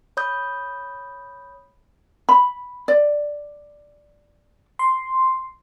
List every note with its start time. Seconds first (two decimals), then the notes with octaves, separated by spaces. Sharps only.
0.17 C#5 B5 D#6 G6
2.29 B5
2.88 D5
4.79 C6